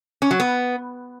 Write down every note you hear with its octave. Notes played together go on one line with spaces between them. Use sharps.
C#4
F#3
B3